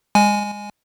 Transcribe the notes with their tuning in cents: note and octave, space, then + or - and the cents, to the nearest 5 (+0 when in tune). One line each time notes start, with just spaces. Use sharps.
G#3 -25 G#5 +5